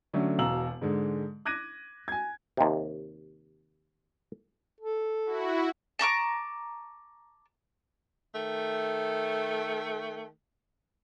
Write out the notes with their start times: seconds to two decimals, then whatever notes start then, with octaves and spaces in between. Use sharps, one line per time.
0.14 D3 F#3 A3 C#4
0.38 E1 B2 F5 A#5 E6 F#7
0.81 G#2 D3 G#3
1.45 D6 F#6 G#6 A#6 D#7
2.08 G#5 G#6
2.57 D#2 C3
4.80 A4
5.25 E4 F#4
5.99 A5 A#5 C#6 D6
8.34 D#3 A3